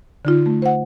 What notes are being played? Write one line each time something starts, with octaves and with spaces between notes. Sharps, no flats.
D3 D#4 F4
A3
C5 F#5